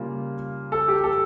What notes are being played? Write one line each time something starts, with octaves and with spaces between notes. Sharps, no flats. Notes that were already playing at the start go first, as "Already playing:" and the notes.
Already playing: C#3 G3 A#3 F4
A4
G4
A4